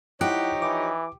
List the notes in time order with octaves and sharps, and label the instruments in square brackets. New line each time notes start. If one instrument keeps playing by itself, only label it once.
[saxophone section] F3 D#4 C#5 [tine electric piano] E4 F#5 F#6 [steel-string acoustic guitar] G4
[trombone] E3 [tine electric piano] D6